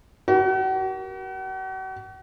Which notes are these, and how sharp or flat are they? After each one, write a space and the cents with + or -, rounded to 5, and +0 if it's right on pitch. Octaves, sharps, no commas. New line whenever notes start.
F#4 +40 A#4 +25